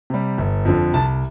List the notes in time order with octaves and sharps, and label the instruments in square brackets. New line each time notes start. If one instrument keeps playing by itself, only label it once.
[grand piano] C3 G3
G1
F2 D3 F3
C2 A5